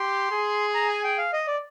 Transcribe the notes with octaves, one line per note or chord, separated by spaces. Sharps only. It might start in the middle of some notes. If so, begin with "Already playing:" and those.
Already playing: G4 C6
G#4
A#5
G#5
G5
F5
D#5
D5